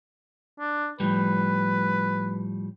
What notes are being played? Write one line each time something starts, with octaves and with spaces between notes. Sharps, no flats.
D4
A2 F3 G3 B4